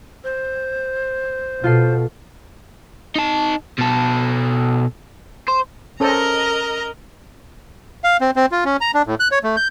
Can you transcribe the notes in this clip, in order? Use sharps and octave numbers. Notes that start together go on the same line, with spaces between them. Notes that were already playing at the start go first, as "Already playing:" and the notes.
C5
B2 F4 A4 C7
D#4 A5
B2 A4
C5
C#4 A4 A#4 C5 D#5 A#5
F5
C4
C4
F4
C#4
A#5
D4
A2
F#6
C#5
A3
G6